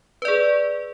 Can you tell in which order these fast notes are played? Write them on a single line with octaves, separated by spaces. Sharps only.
B4 D5 G#4